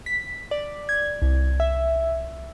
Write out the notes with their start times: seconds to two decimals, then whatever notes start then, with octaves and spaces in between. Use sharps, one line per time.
0.06 B6
0.51 D5
0.89 G#6
1.22 C2
1.60 E5